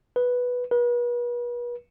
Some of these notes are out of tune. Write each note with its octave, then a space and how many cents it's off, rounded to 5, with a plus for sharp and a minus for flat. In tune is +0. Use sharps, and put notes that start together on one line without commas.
B4 -5
B4 -40